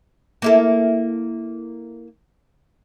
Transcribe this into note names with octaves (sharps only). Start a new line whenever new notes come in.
A#3 E4 A4